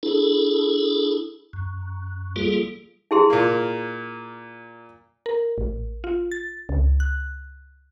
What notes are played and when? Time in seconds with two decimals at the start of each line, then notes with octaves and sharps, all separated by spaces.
0.03 D4 E4 G#4 A4
1.53 F#2
2.36 G3 A#3 F4 G#4 A4
3.11 E4 G#4 C6
3.30 A#2 A#3
5.26 A#4
5.58 A1
6.04 F4
6.31 A6
6.69 C#2
7.00 F#6